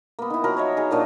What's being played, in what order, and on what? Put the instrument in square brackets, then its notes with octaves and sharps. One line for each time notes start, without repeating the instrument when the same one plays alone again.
[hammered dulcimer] A#3 B3
D#3 E4
F3 F#3 A#4 B5
C#5 D#5 E5
D#4 G#4
A#2 F#3 D4 A#4